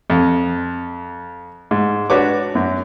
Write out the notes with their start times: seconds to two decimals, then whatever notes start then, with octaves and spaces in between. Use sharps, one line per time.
0.10 F2
1.71 G#2
2.10 D4 F#4 B4 C#5 D6
2.55 F#2